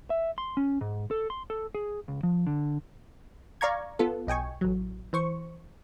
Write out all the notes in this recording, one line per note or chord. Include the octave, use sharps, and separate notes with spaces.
E5
C6
C#4
G#2
A4
C6
A4
G#4
C#2
F3
D3
D5 F5 A#5 C#6 G#6
B3 F4 A4
B1 D#5 G5 G#5 C#6
A1 F#3
E3 C5 C#6